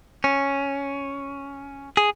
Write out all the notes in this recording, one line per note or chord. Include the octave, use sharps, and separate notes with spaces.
C#4
G#4